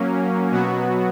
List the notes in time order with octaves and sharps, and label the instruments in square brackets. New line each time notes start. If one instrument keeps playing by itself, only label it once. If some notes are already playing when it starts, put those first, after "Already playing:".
Already playing: [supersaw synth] F#3 A#3 C#4
B2 F#3 B3 F#4